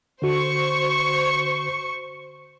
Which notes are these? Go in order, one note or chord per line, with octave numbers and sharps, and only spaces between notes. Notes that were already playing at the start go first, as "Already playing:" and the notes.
D3 F#4 C5 C#6